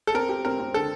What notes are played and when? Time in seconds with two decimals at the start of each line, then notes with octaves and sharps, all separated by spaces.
0.07 A4
0.14 C4 A#4
0.29 G4
0.45 C4 A#4
0.59 C4
0.74 D3 A4